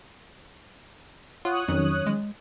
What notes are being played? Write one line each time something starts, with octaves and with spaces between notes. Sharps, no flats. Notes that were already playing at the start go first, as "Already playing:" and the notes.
F4 C#5 F#5 D#6 F#6
F2 D#3 F#3 C#4
G#3